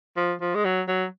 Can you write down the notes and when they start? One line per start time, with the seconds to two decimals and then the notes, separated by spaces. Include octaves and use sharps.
0.17 F3
0.41 F3
0.55 G#3
0.65 F#3
0.88 F#3